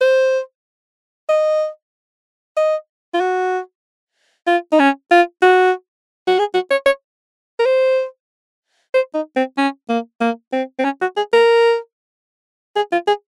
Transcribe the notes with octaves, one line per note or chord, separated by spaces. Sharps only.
C5
D#5
D#5
F4
F#4
F4
D#4
C#4
F4
F#4
F#4
G#4
F#4
C#5
C#5
A#4
C5
C5
D#4
C4
C#4
A#3
A#3
C4
C4
C#4
F#4
G#4
A#4
G#4
F4
G#4